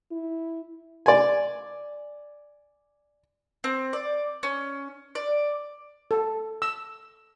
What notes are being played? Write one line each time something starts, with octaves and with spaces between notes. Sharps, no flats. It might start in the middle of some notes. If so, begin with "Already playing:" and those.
E4
D5 G#5
C4
D5
C#4
D5
A4
E6